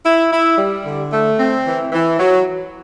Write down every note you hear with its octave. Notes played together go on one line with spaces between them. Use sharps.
E4
E4
G3
D3
A3
C4
E3
E3
F#3